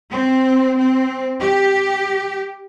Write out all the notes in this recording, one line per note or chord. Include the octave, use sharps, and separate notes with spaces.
C4
C4
G4